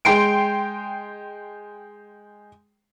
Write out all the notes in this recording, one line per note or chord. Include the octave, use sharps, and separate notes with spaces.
G#3 G5 C6 C7 D7